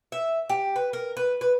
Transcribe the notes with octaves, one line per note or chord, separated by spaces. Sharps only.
E5
G4
B4
A#4
B4
B4